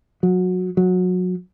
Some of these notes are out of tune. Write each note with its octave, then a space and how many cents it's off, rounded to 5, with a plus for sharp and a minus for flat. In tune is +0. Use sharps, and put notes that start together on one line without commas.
F#3 -20
F#3 -25